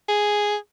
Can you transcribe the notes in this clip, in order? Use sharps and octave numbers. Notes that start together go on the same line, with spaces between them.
G#4